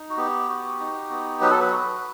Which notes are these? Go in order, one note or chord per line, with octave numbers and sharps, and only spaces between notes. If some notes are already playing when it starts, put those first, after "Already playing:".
Already playing: D#4
F#4
B3 G4
F#4
D#4
B3
F#3 B4
A4
B4
F#4